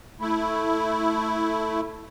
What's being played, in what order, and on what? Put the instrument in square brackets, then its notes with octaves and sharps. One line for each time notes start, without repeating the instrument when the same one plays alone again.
[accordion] A3 E4